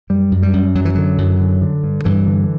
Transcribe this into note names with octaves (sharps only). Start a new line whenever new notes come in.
F#2 G3
F#2
G3
F#2
F#2 F#3
E3
D3 F#3
F#2
D3
D3
G2
G2 E3
D3